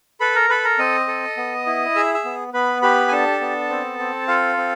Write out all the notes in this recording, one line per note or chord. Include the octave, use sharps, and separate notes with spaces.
A4 B4 B5
A#4 A#5
A4 B4 B5
A#4 A#5
C4 D#5 D#6
A4
B3
E4
G#4 E5 E6
E5 E6
B3
B3 B4 B5
G4 B4 B5
G#5
D4 A4 A5
B3
C4
C4
F4 A4 F5
C4